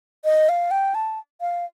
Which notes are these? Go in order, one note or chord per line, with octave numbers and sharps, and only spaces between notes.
D#5
F5
G5
A5
F5